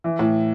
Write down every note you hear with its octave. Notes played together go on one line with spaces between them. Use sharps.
E3
A2